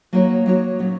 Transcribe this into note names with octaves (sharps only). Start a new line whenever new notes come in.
F#3 A#3 D#4 F#4 C#5
F#3 A#3 D#4 F#4 C#5
A#2 F#3 C#4